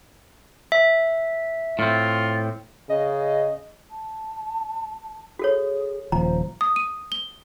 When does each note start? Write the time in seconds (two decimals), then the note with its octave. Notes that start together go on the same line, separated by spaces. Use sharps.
0.72 E5
1.79 A2 C4 F4
2.89 C#3 D#5
3.91 A5
5.39 F#4 G#4 A4 C#5
6.12 D#1 F3 C5 A#5
6.61 D#6
6.76 D#7
7.12 G7